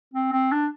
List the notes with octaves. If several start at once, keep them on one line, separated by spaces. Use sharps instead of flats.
C4
C4
D4